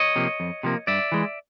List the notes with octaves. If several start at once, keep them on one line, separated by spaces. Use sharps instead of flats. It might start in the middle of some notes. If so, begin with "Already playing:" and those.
Already playing: C#5 D#5
C3 F3 A#3
F2
C3 F3 A#3
G2 D5 E5
E3 G#3